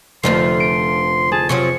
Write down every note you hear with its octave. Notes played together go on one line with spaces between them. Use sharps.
F1 D3 F3 A3 C6
D7
G#4 A5
C3 F3 F#3 C#6